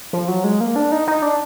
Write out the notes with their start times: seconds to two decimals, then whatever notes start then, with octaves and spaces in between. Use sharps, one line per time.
0.13 F3
0.28 F#3
0.44 G#3
0.61 A#3
0.76 D4
0.92 D#4
1.07 D#4
1.22 D4